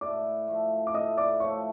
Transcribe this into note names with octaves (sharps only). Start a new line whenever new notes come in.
A2 D5 D6
F3 A3
D6
A2 D#5 D#6
D5 D6
F3 A3 C#5 C#6